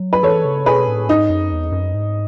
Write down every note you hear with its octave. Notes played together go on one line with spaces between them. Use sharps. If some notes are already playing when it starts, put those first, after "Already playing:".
Already playing: F#3
B4
E3 A4 C#5
C#3
B2 G#4 B4
A2
G#2 D#4
F#2
E2
F#2
G#2